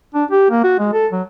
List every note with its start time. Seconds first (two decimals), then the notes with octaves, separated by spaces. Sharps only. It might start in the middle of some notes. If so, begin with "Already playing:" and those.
0.14 D4
0.31 G4
0.51 A#3
0.64 F#4
0.79 G#3
0.93 A4
1.12 F#3